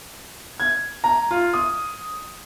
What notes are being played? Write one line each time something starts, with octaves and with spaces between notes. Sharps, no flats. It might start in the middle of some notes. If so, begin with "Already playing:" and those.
G#6
A#5
F4
D#6